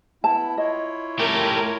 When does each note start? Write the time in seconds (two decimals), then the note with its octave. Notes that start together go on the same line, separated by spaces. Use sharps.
0.24 B3 E4 A5
0.57 E4 F4 C#5 D#5
1.19 A3 G4 A#4